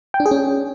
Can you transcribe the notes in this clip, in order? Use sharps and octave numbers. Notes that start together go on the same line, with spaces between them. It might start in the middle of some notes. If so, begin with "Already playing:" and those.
G5
D4
G#4
C#4